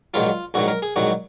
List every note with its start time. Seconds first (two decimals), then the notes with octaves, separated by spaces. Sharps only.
0.14 A#1 G#2 D#3 F#3 F4
0.54 A#1 G#2 D#3 F#3 F#4
0.68 A#4
0.82 G#4
0.96 A#1 G#2 D#3 F#3 F#4